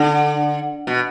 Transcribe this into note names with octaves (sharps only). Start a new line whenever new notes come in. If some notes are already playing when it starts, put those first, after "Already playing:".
Already playing: D3
B2